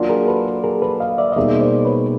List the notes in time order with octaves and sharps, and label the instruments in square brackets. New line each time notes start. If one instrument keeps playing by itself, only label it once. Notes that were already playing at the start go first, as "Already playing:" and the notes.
Already playing: [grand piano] F#3 A#3 D4 F4
[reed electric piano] G#4 A#4
A4 B4
G#4 A#4
A4 B4
D#5 F5
D5 E5
D#5
[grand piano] B2 G3 A#3 D#4 G#4 [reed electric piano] D5 E5
[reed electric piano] C5 D5
B4 C#5